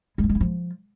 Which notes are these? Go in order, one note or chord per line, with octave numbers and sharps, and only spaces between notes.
G#3
F3
G#3
E4
F3